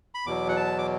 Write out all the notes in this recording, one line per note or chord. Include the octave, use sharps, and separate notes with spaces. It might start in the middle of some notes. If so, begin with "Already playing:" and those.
B5
E2 B2 F#3 D6
F#5
A5
D6